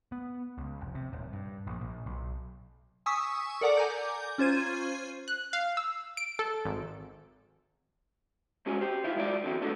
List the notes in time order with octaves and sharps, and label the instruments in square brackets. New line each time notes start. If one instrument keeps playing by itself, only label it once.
[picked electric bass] B3
C#2
F1
C3
D#1
G2
A#1
A#1
B1
[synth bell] G#5 C#6 D#6 E6 B6
A4 A#4 D5 F#5 A#5 D6
G#5 A#5 D6 G6
C#4 F4 C5 G#6 D#7
[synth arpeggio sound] F#6
F5
E6
D7
A4
G#1
[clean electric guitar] G#2 C#4 F#4 G#5
G4 C5
D#3 E4 F4
G#2 F#3 E4 D5
D3 E3 C4 F#4
G#3 A3 B3 D4 F#4 A4